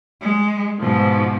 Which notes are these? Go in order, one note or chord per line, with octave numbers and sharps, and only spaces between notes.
G#3
G#2 B2 F3